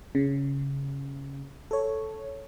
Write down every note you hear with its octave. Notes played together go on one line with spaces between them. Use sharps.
C#3
A4 C#5